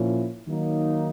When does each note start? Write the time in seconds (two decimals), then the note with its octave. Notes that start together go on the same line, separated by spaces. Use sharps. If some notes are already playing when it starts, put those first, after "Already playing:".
Already playing: A#2 F3 A#3 C#4 E4
0.48 D#3 F#3 A#3 D#4